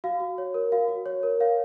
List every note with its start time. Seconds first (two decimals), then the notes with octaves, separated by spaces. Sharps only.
0.04 F#4 F5
0.20 F#4
0.38 C#5
0.54 A#4
0.72 F#4 F5
0.89 F#4
1.06 C#5
1.23 A#4
1.40 C#5 F5